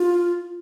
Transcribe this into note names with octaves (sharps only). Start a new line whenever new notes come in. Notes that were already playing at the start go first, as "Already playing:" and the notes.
Already playing: F4